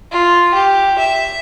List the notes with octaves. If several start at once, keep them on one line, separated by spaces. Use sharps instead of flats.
F4
G4
E5